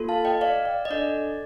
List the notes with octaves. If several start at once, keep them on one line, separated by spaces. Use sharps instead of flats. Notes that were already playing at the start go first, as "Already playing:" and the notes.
Already playing: A#3 F4 A4
F5 A5
D#5 G5
D5 F5
D5
D#5
D4 A4 D5